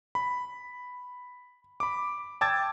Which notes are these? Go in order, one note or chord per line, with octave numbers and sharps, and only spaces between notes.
B5
B5 D6
G5 A5 D6 E6 G#6 A6